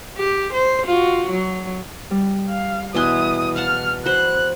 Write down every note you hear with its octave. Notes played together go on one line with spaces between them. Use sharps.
G4
C5
F4 F#4
F#3
G3
F5
E2 B2 E4 G#5 C6 D#6 F#6
F5 F#5 A5 F6
F#4 C5 B5 F#6